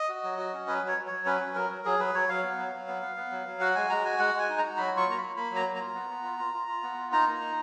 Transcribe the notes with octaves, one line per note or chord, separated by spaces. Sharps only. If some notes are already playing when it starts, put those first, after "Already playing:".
Already playing: D#5
F#4
F#3
F#4
C#4
F#3 B4
F#3 C#5
F#3
C#5
F#3
C#4 B4
C#4
F#3 A#4
F#3
F#3 G#4
F#3 B4
F#3 C#5
F#3 F5
B3
F#3
F#3
B3
B3
B3
F#3
F#3
F#4 F#5
G#3 G#5
G#3 A#5
F#4 G#5
G#3 F#5
G#3 G#5
D#4
F#4 A#5
F#3 B5
F4
C#6
A#3 A#5
A#3 B5
A#3 B5
F#3
A#5
A#3
F4 A#5
B3
B3
F4
F4
F4
F4
B3
F4
D#4 A#5
A#3
D#4